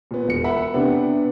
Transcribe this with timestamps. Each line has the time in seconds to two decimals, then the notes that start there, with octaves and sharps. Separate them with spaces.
0.11 A#2 B3
0.28 E1 C#7
0.44 E5 F#5 B5
0.74 C3 B3 D4 G4